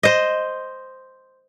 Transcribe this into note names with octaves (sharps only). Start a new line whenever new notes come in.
C5 D#5